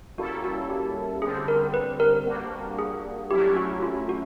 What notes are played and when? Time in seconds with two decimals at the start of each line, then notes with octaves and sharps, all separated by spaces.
0.18 G3 A#3 C#4 E4 F#4 A4
0.44 F#4
0.70 G4
1.22 D3 G3 C4 G#4
1.48 A#4
1.74 B4
2.00 A#4
2.26 G3 A#3 D4 F#4
2.79 G#4
3.31 F#3 A3 C#4 E4 G4
3.56 F#4
3.83 F4
4.09 F#4